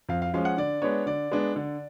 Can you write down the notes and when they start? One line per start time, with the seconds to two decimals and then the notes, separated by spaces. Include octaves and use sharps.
0.09 F2 F5
0.22 F5
0.34 F3 G#3 C#4 F5
0.45 F#5
0.58 D3 D5
0.82 G#3 B3 D4 C#5
1.06 D3 D5
1.31 G#3 B3 D4
1.56 D3